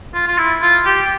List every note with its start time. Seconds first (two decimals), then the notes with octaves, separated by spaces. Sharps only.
0.14 F4
0.27 F4
0.38 E4
0.62 F4
0.85 G4